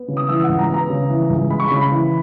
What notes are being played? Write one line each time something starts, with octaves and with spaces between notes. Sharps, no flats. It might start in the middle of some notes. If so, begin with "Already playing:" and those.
Already playing: B3
C#3
D#6
E3 E6
C#2 F#5
A#5
B3 A#5
C#3
E3
C#2
G#3 B5
C#6
C#3 B5
B5
E3